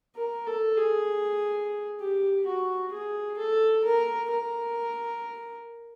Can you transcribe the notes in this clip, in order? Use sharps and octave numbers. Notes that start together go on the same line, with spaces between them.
A#4
A4
G#4
G4
F#4
G#4
A4
A#4
A#4